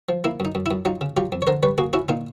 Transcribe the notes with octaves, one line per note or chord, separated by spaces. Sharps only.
F3
A#3 E4
F#2 D#4
F#2
E4
F#2
F#3 D#4 F4
C#3
F#3 F4 G4
F2
C#5
D3 A#4 C5
G3 B4 C#5
A#3 F#4 G#4
C#4 E4 F#4
A#2 D#4 F4